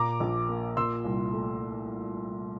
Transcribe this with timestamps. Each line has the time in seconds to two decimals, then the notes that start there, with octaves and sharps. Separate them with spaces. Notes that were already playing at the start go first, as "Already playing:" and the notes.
Already playing: A#2 A#5 D6
0.20 A#1
0.49 A#3
0.77 A#2 C6 E6
1.05 C2
1.33 A3